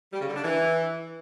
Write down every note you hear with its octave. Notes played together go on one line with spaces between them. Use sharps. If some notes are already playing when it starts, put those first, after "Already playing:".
G3
C#3
D3
D4
E3